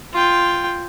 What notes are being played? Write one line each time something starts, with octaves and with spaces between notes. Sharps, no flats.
F4 G5